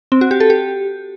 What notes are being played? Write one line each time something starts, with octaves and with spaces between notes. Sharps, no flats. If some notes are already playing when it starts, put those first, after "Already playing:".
C4
F#4
G4
A4
G4